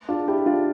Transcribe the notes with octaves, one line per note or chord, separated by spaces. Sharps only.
D4 F4
E4 G4
D4 F4